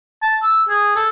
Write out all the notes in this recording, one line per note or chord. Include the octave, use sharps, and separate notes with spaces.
A5
E6
G#4
A4